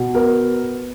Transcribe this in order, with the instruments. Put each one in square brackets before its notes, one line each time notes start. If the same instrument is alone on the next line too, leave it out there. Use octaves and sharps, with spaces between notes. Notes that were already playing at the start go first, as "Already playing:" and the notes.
Already playing: [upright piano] B2
B3 A#4